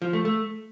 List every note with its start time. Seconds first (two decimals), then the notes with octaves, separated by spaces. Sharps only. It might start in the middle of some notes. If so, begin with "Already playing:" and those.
0.02 F3
0.13 A3
0.25 A3